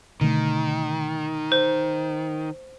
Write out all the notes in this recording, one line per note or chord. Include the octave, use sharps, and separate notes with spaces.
B2 D3 D#3 A3
C5